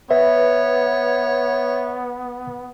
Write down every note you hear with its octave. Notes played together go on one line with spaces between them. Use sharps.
B3 B4 C#5 E5